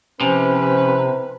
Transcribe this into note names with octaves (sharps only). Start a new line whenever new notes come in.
C3 F3 C#4 E4 B4 C5